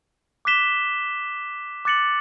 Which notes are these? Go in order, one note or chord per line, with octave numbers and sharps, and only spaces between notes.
D6 F#6 B6 E7 G7
D6 F#6 A6 C#7 F#7